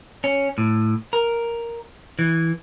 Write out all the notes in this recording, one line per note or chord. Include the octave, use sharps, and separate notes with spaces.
C#4
A2
A#4
E3